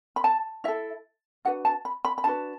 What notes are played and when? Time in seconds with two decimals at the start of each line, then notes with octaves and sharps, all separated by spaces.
0.16 B5
0.24 A5
0.64 E4 A4 E5
1.45 D4 F#4 B4 F#5
1.65 A5
1.85 B5
2.05 B5
2.18 B5
2.24 D4 F#4 B4 A5